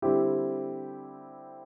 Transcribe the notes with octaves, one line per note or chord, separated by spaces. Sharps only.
D3 G3 C4 E4 G4